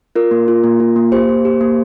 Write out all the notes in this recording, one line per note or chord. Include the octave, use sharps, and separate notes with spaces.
F4 A#4
A#3
F4
A#3
F4
A#3
G4 C5
A#3
G4
A#3